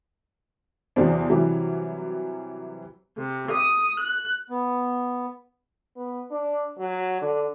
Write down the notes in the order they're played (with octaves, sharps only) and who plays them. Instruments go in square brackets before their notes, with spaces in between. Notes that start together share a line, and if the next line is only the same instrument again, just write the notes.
[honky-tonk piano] E2 C3 F#3 C4 D4
C3 E3 F#3 G3
[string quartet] C3
D#6
F#6
[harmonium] B3
[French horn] B3
D4
F#3
D3